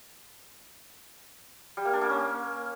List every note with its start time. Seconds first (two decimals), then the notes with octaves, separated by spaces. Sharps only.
1.77 G3
1.85 A#3
1.93 D4
2.01 A#3
2.09 C#4